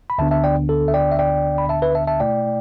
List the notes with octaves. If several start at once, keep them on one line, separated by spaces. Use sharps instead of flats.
B5
D2 D3 B3 D4 E5 A5
E5 A5
D5 G5
A4
E5
D5 G5
E5
D5 G5
B5
E5 A5
B4 E5
E5 A5
E5 A5
B2 A3 E4 D5 G5